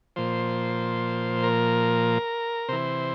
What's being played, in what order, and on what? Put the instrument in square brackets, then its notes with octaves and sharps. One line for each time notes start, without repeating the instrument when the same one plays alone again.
[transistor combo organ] A#2 F3 C5
A#4
C3 E3 C5